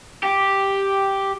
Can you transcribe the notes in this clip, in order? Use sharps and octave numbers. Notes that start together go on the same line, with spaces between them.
G4